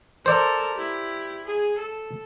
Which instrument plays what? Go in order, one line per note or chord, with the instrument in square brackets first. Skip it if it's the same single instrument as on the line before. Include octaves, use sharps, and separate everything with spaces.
[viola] A4 A#4 [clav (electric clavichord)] C5 D5
[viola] E4 G4
G#4
A4